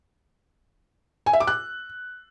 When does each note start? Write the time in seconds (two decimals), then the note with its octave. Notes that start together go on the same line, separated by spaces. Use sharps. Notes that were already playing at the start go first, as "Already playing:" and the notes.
1.26 G#5
1.33 E5
1.40 D6
1.47 F#6